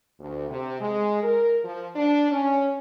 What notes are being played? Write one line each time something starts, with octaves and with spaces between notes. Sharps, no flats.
D2
C3
G#3
A#4
F3
D4
C#4